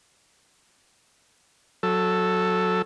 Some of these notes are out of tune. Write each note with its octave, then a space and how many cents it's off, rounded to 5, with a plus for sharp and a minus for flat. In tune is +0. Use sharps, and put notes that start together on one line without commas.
F#3 -15 A4 +0